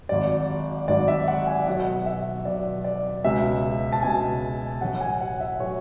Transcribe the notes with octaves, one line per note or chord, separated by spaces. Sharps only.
G#1 G#2 F#3 D5
G#1 G#2 F#3 D5
E5
F#5
G#5
B1 B2 F#3 F#5
E5
B1 B2 F#3 D5
D5
C#2 B2 G#3 E5
A5
C#2 B2 G#3 G#5
A1 A2 F#3 F#5
G#5
F#5
E5
A2 F#3 C#5